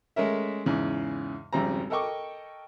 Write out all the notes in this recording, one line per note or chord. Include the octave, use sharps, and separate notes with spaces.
G#3 A3 C#4 A#4 E5
E2 G#2 C#3 E3
G#1 F2 C#3 G3 C4 A#5
A4 A#4 D#5 G5 C#6 D6